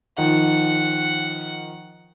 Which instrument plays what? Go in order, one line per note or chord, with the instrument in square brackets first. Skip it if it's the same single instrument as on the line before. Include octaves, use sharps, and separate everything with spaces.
[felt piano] D#3 F3 [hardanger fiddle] F#5